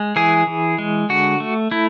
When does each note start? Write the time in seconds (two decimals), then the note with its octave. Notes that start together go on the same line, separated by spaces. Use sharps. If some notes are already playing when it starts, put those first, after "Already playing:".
Already playing: G#3
0.16 E3 G#4
0.47 E3
0.78 G#3
1.09 D3 F#4
1.40 A3
1.71 A3 E4